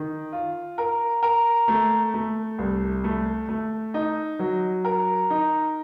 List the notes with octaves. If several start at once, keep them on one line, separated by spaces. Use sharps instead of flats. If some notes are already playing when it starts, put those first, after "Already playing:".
Already playing: D#3
F4
A#4
A#4
A3
A3
C2
A3
A3
D#4
F#3
A#4
D#4